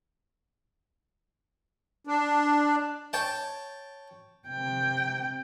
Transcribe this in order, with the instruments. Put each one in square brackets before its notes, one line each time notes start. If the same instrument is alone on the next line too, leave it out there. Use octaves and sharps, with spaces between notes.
[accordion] D4
[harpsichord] C#5 G5 A5
[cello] C3 G5